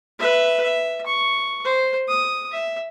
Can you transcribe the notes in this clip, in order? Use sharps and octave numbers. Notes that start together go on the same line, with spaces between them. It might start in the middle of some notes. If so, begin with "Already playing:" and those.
B4 E5
E5
C#6
C5
D#6
E5